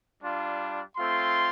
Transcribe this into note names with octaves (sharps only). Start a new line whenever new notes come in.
G3 D4 F4
A3 C4 F4 C6